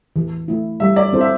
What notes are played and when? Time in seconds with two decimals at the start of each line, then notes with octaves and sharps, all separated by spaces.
0.16 E3
0.48 A3 E4
0.80 G3 E5
0.96 D5
1.13 C4 E4 A4 C5
1.21 E5